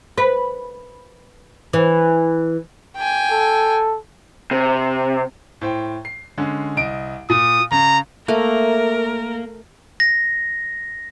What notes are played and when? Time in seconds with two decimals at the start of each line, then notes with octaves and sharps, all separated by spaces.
0.18 B4
1.73 E3
2.97 G5 G#5
3.32 A4
4.51 C3
5.61 A2 C5 G5
6.05 C7
6.38 D3 G#3 C#4
6.77 C2 D#5 D7
7.30 A#2 D#6
7.72 C#3 A#5
8.28 A3 A#3 A#4
10.00 A#6